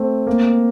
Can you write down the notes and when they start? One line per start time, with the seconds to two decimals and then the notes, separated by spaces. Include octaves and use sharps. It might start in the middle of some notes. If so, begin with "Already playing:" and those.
Already playing: A3 C4
0.27 A#3